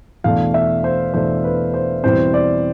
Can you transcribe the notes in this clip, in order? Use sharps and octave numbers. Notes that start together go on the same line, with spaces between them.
E2 B2 A3 D4 F5
E5
C5
E2 B2 A3 D4 C5
B4
C5
E2 B2 G3 C4 E4 C5
D5